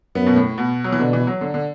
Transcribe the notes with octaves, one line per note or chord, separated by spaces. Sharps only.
F#2 B3
B2
A2
B2
F#3
E3
B2 D3
E3
F#3
D3
D3